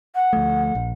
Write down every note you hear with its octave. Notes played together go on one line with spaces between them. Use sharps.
F#5
D2 F3 A3
A#1